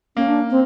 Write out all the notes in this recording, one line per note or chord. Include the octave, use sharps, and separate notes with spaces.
A#3 C#4
D4
C4